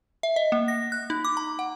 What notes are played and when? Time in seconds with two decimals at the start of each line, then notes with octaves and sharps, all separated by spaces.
0.23 E5
0.36 D#5
0.52 A#3
0.68 A#6
0.92 F#6
1.10 D#4
1.25 D6
1.37 A#5
1.59 F#5